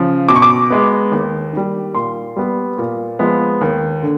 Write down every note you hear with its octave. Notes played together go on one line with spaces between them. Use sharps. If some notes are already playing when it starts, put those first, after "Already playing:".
Already playing: C#3 F3
B2 D6
C#6
D6
G#3 B3
D#2
D#3 G3
A#2 C6
G3 B3
A#2
F3 G#3 B3
D#2
D3